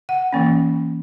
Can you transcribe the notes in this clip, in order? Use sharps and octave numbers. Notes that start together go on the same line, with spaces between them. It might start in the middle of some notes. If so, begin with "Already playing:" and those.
F#5
E3 A#3 C#4